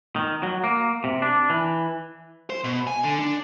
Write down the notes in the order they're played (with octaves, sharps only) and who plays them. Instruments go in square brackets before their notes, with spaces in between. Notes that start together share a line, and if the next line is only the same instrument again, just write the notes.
[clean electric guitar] D#3
F#3
A#3
C3
D4
E3
[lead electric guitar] C5
B2
G#5
D3
D4